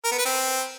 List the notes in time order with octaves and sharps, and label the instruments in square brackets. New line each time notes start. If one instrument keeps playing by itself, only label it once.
[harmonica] A#4
B3
B4
C4